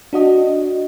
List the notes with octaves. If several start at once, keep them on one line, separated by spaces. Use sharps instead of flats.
D4 F#4 D#5